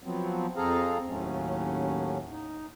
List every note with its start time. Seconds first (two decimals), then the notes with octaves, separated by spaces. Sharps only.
0.03 F3 F#3 B3 C4
0.56 F2 C4 G#4 A4 F5 A#5
1.07 D#2 A2 F#3 A3 C#4
2.30 D#4